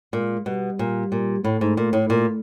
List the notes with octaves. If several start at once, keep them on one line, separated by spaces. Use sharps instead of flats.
A#2 G#3
B2 G3
A#2
A#2
A2 A3
G#2
A#2
A2
A#2